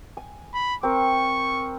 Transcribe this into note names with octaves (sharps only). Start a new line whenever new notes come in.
G#5
B5
C4 A#4 C#6